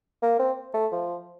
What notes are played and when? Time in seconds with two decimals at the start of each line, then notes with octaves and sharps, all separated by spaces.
0.23 A#3
0.40 C4
0.74 A3
0.92 F3